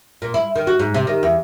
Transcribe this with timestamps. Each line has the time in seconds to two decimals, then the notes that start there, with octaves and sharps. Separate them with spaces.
0.22 A#2
0.34 E4
0.56 D#3
0.67 F#4
0.79 G#2
0.94 C3
1.07 D#3
1.23 E2